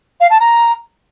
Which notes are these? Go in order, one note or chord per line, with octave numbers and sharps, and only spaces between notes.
F5
A5
A#5